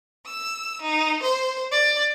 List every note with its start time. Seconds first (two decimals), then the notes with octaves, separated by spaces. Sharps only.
0.25 E6
0.81 D#4
1.22 C5
1.71 D5